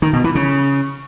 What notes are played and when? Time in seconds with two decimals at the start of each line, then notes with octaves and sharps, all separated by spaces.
0.02 D#3
0.13 B2
0.24 E3
0.35 C#3